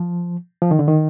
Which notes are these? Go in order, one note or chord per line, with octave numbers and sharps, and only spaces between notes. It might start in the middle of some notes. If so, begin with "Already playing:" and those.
Already playing: F3
F3
D#3
D3
D#3